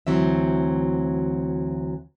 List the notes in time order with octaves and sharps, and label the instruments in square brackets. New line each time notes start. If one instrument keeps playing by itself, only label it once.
[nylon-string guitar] D2 E3 F#3 C4 E5